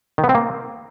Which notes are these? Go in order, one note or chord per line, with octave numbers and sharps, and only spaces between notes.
D#3
B3
C4
A#3